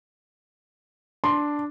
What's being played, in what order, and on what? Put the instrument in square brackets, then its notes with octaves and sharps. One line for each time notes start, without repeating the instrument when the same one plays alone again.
[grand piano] D4 [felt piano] C6